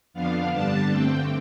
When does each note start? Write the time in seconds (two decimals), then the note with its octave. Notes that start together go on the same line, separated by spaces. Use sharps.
0.14 F2 D3 F3 B3 D4 F5
0.52 G2 D3 G3 D4 A5
0.89 G2 D3 A3 C4 G5